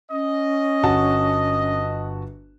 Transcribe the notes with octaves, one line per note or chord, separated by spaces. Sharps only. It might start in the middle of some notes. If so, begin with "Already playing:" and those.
C#4 D#5
G1 F#4 A5